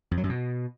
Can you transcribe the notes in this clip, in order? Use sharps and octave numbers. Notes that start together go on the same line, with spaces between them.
F2
F#3
F#2
B2